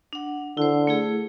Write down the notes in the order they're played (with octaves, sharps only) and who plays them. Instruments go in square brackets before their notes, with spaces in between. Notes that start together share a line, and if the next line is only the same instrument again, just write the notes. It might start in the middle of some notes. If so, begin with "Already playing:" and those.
[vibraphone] D4 F#5
[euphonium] D3 [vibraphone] E4 C5
[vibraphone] A3 E4 G#4